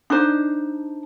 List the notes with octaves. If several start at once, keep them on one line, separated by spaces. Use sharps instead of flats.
D4 D#4 C5